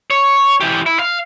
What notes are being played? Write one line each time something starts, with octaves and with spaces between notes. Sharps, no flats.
C#5
E3 G4
E4
F5